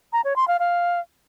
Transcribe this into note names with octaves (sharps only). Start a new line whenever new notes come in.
A#5
C#5
C6
F5
F5